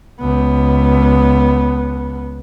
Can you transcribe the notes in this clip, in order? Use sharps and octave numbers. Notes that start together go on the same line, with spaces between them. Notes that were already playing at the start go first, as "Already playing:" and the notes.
C#2 B3